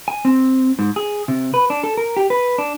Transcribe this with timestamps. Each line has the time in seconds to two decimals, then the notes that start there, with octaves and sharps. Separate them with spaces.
0.08 G#5
0.25 C4
0.79 G#2
0.96 G#4
1.28 C3
1.54 B4
1.70 D4
1.84 A4
1.98 A#4
2.17 G4
2.30 B4
2.58 D4